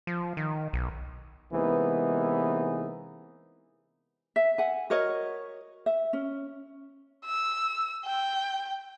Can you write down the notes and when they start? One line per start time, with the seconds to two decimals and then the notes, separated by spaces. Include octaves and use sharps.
0.07 F3
0.37 D#3
0.73 B1
1.52 C3 E3 G#3 A#3 B3 D#4
4.36 E5
4.58 F#5 G#5
4.90 F#4 A#4 C#5 D#5
5.86 E5
6.13 C#4
7.25 E6
8.05 G5